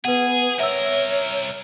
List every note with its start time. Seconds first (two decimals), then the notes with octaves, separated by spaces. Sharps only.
0.05 B3 G#4 B4 F#5
0.59 C2 A#4 C#5 E5 E6